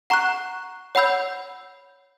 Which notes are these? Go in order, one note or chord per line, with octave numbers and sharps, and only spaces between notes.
F#5 A#5 C#6 F#6
C#5 F#5 B5 E6 G6